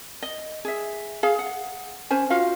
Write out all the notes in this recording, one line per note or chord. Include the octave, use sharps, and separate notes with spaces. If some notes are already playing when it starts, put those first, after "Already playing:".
D#5
G#4 E5
G#4 F5
F#5
C#4 C5 G#5
F4 F#4 F5